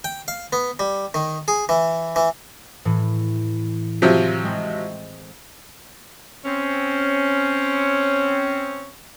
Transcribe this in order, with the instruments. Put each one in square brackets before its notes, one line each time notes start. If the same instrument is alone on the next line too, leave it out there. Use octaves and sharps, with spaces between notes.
[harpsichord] G5
F5
B3
G3
D#3
G#4
E3
E3
[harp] A2 E3
[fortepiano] C3 F3 F#3 [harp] D#7
[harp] G#3 C4
[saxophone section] C4 C#4